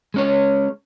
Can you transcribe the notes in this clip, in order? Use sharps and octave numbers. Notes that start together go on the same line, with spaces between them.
G#3 C#4 C#5